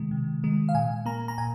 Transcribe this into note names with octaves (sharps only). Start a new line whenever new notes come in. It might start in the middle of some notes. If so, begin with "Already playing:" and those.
Already playing: C3 D#3 G#3
C3
D#3 G#3
F5
A#2 G#5
A#3 A#5
A#5
A#2 G#5